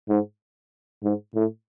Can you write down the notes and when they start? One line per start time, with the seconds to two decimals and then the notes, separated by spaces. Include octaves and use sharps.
0.09 G#2
1.03 G#2
1.35 A2